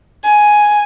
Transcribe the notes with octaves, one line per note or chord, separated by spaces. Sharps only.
G#5